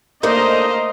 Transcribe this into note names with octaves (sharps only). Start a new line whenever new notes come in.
A3 A#3 D4 D#4 C5 D#5 F5 A#5